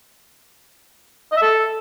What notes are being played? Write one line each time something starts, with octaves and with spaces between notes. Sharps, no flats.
D#5
E5
A4